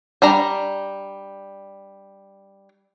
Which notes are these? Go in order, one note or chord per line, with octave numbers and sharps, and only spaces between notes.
G3 D4 A#5